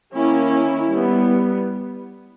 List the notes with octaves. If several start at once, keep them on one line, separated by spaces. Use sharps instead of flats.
D#3 A#3 C#4 E4
G3 B3